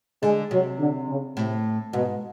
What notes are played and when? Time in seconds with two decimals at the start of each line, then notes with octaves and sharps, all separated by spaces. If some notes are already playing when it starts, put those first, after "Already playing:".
0.22 D3 G#3
0.51 C3 F#3
0.79 D3
1.08 C#3
1.36 A2 C3
1.93 G#2 B2